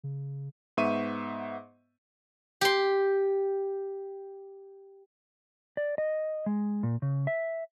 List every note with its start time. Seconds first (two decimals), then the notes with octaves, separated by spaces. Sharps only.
0.04 C#3
0.77 G#2 B3 E5 C#6 D#7
2.61 G4 C6
5.77 D5
5.98 D#5
6.46 G#3
6.83 A#2
7.02 C#3
7.27 E5